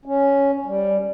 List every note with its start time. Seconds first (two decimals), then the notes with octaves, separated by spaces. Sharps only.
0.06 C#4
0.66 G3